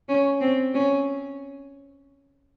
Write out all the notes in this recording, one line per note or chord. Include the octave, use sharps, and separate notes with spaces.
C#4
C4
C#4